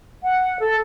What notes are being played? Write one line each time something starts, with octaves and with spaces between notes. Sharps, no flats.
F#5
A4